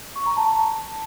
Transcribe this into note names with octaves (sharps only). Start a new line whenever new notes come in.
C#6
A#5
A5